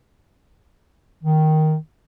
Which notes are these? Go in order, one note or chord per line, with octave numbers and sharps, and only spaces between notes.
D#3